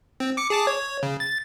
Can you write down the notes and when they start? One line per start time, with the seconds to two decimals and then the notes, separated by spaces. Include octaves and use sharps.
0.20 C4
0.37 D6 C#7
0.50 G#4 A5 D6
0.67 C#5
1.03 C#3
1.20 A6